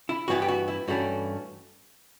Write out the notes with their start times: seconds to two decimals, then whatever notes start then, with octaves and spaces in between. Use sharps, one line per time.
0.09 E4
0.28 G2 E3 B3 E4 F#4
0.42 G4
0.48 F#4
0.68 E4
0.88 G2 E3 A3 C#4 F#4